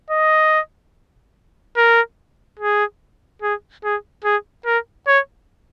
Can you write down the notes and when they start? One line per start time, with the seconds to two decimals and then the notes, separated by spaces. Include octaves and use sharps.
0.10 D#5
1.76 A#4
2.59 G#4
3.42 G#4
3.84 G#4
4.24 G#4
4.66 A#4
5.07 C#5